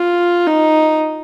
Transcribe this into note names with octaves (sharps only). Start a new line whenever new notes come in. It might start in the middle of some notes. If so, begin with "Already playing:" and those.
Already playing: F4
D#4